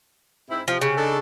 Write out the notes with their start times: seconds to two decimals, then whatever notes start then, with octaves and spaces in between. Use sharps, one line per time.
0.50 G#2 C4 E4
0.68 C3 F3
0.81 C#3
0.97 D4 D#4 A4